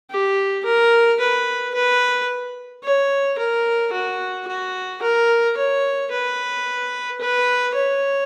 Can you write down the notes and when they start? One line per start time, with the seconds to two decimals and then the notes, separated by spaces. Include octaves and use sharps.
0.10 G4
0.65 A#4
1.20 B4
1.74 B4
2.84 C#5
3.38 A#4
3.92 F#4
4.47 F#4
5.02 A#4
5.57 C#5
6.11 B4
7.20 B4
7.75 C#5